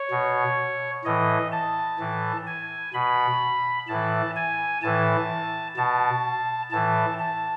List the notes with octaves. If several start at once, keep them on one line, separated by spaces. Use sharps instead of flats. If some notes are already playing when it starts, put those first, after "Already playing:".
Already playing: C#5
B2
A2 E3 D#5
A5
A2 E3
G#5
B2 B5
A2 E3 A5
G#5
A2 E3 A5
B2 A5
A2 E3 A5
A5